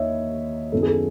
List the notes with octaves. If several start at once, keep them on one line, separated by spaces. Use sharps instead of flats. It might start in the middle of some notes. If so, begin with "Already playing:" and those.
Already playing: D#2 C#5 D#5 E5
F#2 D#3 F#3 B3 E4 A4
G#4
A4